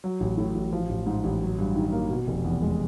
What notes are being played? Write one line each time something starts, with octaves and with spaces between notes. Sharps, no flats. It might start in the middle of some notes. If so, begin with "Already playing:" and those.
F#3
A1
A2
A1
F3
A1
G#2
A1
F#3
G2
D#3
A#3
B2
F1
E2
G#3